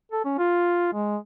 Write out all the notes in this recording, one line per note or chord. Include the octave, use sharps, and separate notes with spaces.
A4
C#4
F4
G#3